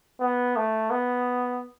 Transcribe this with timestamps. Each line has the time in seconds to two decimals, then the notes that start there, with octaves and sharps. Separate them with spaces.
0.20 B3
0.56 A3
0.91 B3